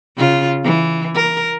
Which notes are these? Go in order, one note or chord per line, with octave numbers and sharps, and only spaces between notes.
C#3 F4
E3
A#4